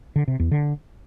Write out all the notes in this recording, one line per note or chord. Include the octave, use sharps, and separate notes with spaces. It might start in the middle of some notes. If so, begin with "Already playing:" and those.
D3
C3
E2
D3